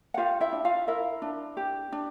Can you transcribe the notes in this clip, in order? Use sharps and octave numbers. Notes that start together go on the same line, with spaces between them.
F#5
F4 G4 F5
E4 E5
D4
F4 F5
E4 A#4 E5
D4
G4
D4